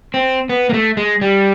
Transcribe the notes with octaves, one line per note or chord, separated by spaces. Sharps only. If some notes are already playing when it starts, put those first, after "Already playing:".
C4
B3
A#3
A3
G#3
G3